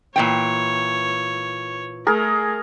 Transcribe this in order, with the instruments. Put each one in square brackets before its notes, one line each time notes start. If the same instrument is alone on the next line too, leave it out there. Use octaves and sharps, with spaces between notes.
[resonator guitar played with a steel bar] A#2 E3 G5 [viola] C#5
[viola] A3 [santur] G#4 A#4